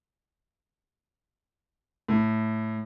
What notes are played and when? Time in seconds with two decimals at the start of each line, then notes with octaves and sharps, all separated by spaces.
2.09 A2